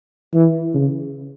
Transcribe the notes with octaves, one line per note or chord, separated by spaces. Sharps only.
E3
C#3